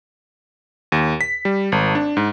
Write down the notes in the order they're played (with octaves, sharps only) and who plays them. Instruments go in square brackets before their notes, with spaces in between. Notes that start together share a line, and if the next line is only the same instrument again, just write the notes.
[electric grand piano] D#2
B6
G3
G#1
D4
G#2